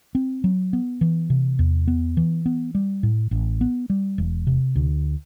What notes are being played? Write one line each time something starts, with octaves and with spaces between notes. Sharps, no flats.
C4
F#3
B3
E3
C3
E2
B3
E3
B3
G3
A2
A1
B3
G3
E1
C3
D2